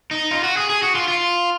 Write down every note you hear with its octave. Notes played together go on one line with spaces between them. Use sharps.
D#4
F4
F#4
G#4
G#4
F#4
F4
F4